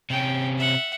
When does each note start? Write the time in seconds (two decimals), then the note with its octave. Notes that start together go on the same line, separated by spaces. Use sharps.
0.10 C3 C#4 G5
0.58 E5 F#5